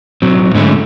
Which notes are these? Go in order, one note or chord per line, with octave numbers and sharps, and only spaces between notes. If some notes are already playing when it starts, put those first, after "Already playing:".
B1 F#3 C4
G#2 D3 G#3 A3 C#4 E4